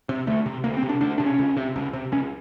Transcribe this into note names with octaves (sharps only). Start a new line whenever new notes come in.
C3
D2 A3
C3
D2 A#3
C4
C3
D4
D2 D4
C3 D4
C#4
C#2
C3
C#2
C3
C#2 C#4